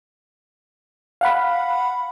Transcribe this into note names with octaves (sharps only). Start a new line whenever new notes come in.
F5 F#5 B5